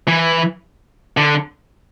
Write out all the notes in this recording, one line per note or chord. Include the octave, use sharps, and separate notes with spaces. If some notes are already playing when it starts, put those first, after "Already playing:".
E3
D3